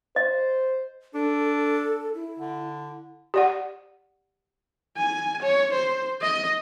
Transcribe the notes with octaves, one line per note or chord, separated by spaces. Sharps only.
C5 D#5
D4 A4
E4
D3
G4 D5 F#5
G#5
C#5
C5
D#5